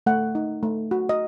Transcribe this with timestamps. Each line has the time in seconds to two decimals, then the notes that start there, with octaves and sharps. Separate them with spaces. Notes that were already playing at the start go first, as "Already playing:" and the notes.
0.06 A3 F#5
0.35 D#4
0.63 A3
0.91 F#4
1.09 D#5